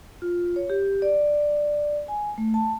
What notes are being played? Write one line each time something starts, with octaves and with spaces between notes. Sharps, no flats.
F4
C#5
G4
D5
G#5
A3
A5